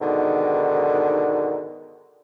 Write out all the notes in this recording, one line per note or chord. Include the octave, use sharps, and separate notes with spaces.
G#2 B2 D3 D#3